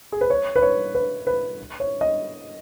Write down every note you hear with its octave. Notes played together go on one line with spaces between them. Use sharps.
G#4
B4
C#5
B4
C#5
B4
B4
C#5
D#5